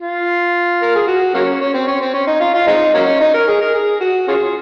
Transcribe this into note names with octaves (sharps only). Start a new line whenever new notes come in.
F4
A#4
G#4
F#4
F#3 A#3 C#4
C#4
C4
C#4
C4
C#4
D#4
F4
F4
G#3 C4 D#4
F#3 A#3 C#4
D#4
A#4
G#4
A#4
G#4
F#4
C#4 F4 G#4